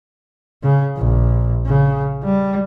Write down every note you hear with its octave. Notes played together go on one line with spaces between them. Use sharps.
C#3
A#1
C#3
G3